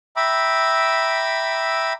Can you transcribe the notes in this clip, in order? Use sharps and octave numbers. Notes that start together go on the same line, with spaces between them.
E5 G5 A#5 B5 D6 E6